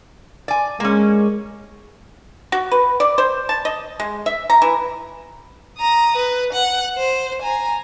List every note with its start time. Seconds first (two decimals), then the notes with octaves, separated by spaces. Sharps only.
0.48 D5 G#5
0.80 G#3 A#3 C#4
2.52 F#4
2.72 B4
3.00 D5
3.18 C5
3.49 A5
3.65 D#5
4.00 G#3
4.26 E5
4.50 A#5
4.62 E3
5.78 A#5 D#6
6.17 B4
6.53 F#5
6.97 C5
7.42 G#5 A#5